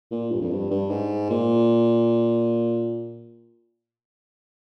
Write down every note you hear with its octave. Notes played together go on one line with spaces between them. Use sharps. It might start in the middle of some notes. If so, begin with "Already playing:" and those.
A#2
G2
F2
G2
G2
G#2
A#2